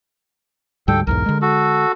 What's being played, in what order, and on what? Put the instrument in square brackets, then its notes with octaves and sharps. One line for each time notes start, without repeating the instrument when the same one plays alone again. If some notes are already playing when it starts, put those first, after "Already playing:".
[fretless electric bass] D2 G#2 G3 [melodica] A4 G5
[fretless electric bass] B1 E2 G#2 [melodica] A#4
[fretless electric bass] D3 G#3
[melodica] F#4 A4